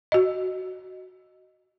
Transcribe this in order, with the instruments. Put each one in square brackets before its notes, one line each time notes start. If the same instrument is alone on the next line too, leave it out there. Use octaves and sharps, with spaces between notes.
[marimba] F#4 D#5